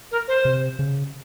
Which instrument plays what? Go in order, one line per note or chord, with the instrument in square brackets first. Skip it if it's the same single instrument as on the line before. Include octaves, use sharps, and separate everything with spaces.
[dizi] A#4
C5
[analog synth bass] C3
C#3